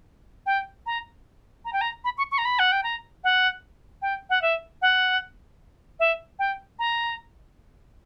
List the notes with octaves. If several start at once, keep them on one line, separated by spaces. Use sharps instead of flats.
G5
A#5
A#5
G5
A#5
B5
C#6
C#6
A#5
B5
F#5
G5
A#5
F#5
G5
F#5
E5
F#5
E5
G5
A#5